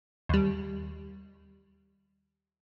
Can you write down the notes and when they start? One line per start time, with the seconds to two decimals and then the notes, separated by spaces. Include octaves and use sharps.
0.29 D#2 G3